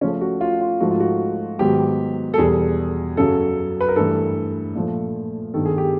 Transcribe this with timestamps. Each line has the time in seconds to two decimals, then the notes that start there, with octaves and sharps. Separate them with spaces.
0.01 C#3 F3 A3 C#4
0.21 F#4
0.41 F4
0.61 F4
0.80 G#2 F3 A3 F#4
0.91 F4
1.00 F#4
1.59 G#2 D#3 F#3 B3 G4
2.34 A4
2.38 E2 B2 G3 G#4
3.17 F#2 C#3 F#3 A4
3.81 B4
3.89 A#4
3.96 G2 E3 A3 A4
4.75 A#2 F3 A3
5.54 G2 D#3 G3 B3 A4
5.66 G#4
5.78 G4